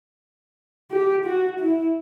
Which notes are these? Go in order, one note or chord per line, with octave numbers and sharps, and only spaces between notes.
G4
F#4
E4